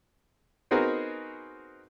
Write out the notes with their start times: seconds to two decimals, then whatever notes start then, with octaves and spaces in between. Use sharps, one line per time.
0.71 B3 C4 D#4 F#4 G#4 A#4